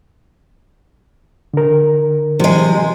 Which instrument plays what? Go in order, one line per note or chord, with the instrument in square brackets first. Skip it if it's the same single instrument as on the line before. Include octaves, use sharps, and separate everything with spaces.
[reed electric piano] D3 A#4
[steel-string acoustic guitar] C3 G#3 [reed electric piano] E3 F#3